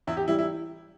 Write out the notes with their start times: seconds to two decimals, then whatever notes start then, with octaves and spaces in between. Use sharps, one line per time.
0.07 E2 E4
0.17 G4
0.28 E3 G3 E4
0.39 E4